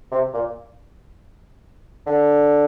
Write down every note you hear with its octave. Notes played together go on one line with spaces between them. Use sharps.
C3
A#2
D3